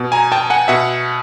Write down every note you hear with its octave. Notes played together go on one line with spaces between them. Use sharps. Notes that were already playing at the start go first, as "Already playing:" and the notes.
Already playing: B2
G#5 A#5
G5 A5
F#5 G#5
B2 E5 F#5